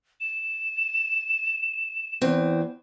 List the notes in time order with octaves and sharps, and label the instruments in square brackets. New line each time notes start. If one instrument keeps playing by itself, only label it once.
[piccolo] E7
[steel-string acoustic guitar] E2 C4